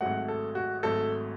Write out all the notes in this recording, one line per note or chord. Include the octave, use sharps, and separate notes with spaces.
G#1 G#2 F#3 A3 F#5
A4
F#4
G#1 G#2 F#3 A3 A4